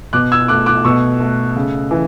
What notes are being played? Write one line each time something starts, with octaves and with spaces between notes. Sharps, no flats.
B2 D6 F#6
E6 G#6
A3 D6 F#6
D6 F#6
B2 C#6 E6
A3
C#3
E3